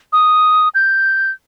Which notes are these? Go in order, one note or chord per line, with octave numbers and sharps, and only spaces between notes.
D#6
G6